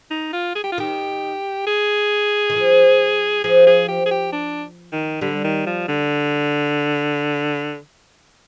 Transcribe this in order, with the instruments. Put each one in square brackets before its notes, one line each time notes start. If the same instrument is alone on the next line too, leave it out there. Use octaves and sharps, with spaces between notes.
[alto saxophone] D#4
F4
G#4
G4
F4
[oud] D#3 [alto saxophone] G4
[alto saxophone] G#4
[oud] D#3
F3
[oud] F3 [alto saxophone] G#4
[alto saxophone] G#4
G4
G#4
G4
D4
D#3
[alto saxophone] D3 [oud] G3
[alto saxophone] D#3
F3
D3